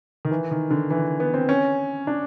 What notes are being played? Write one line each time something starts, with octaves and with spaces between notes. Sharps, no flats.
D#3
E3
D#3
D3
E3
B3
C4
C#4
D4